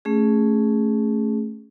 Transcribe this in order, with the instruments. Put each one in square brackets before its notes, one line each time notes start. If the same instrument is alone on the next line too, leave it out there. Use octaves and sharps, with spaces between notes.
[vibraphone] A3 C#4 G#4